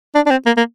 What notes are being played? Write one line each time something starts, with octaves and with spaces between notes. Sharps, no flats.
D4
D4
C4
A#3
A#3